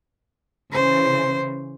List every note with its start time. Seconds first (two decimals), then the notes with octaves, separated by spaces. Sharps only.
0.73 C#3 E3 C5